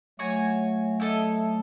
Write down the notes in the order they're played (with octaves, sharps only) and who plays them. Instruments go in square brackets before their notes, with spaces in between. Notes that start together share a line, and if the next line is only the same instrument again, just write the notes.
[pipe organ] F#3 A3 [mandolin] F#4 C#5 G#5
[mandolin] E4 A4 D#5